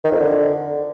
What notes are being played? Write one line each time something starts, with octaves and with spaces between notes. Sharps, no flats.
D#3
F2
D3